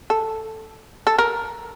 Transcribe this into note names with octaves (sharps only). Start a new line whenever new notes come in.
A4
A4
A#4